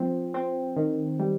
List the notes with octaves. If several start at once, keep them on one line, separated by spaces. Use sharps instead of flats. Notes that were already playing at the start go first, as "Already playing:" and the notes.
Already playing: F3 C4
C4
D#3
G3